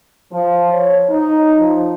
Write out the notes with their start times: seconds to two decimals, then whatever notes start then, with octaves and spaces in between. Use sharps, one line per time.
0.32 F3
0.72 C#5
1.09 D#4
1.59 F3